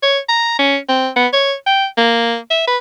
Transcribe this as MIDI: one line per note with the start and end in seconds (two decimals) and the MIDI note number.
0.03 0.19 73
0.29 0.58 82
0.59 0.77 61
0.89 1.09 60
1.16 1.27 59
1.33 1.54 73
1.67 1.85 79
1.97 2.37 58
2.50 2.64 76
2.67 2.77 71